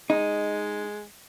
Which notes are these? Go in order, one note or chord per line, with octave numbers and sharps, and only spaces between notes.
G#3 D#4